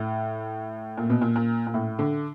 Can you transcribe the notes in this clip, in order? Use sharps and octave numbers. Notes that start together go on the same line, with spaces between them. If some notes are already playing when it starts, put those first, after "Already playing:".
Already playing: A2
A#2
B2
A#2
A#2
A#2
A2
D3